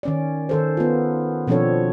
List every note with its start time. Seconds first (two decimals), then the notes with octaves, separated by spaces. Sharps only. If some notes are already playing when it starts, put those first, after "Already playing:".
0.03 D#3 C#4 D5
0.49 D#3 A4 C5
0.77 B3 F4
1.47 B2 F3 C4 D4 A4 C#5